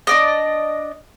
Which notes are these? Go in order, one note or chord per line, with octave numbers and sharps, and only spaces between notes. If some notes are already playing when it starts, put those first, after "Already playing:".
D4 D5 D#5